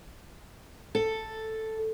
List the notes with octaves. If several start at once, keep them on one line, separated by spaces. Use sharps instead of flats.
A4